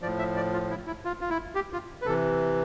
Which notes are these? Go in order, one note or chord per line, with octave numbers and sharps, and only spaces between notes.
A2 F3 D5
E5
D5
F4
E4
E4
F4
F4
E4
G4
F4
B4
C3 E3 A4